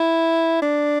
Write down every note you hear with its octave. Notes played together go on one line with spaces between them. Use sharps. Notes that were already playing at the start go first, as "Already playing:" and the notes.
Already playing: E4
D4